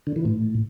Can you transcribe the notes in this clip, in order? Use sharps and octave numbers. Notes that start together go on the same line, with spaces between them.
D3
E3
A2